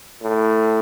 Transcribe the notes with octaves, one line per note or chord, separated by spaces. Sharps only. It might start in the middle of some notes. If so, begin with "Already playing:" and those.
A2